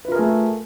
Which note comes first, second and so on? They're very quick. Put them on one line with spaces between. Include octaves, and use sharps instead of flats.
B4 F4 A#4 G#4 A3